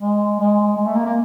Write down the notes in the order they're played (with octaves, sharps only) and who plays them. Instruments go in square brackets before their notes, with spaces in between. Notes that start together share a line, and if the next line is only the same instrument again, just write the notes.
[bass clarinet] G#3
G#3
G#3
A3
A#3
A#3